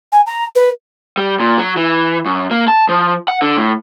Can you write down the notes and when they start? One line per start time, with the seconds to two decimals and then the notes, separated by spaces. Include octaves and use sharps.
0.12 G#5
0.26 A#5
0.55 B4
1.18 G3
1.40 A#2
1.58 F#3
1.77 E3
2.26 F#2
2.51 A#3
2.68 A5
2.89 F3
3.28 F#5
3.42 D3
3.57 A2